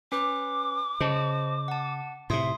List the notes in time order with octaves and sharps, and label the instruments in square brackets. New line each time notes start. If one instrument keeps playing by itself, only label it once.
[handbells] C#4 B4 [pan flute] D6
[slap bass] C#3 [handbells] C5 D#5 A5
[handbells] F#5 A5
[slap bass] A2 C3 [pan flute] E5 [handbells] C6 D#6